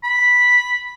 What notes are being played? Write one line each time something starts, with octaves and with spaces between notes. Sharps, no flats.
B5